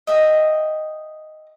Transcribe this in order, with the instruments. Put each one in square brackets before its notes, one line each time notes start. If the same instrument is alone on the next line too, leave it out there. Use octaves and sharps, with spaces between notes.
[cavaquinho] D#5 E5 G5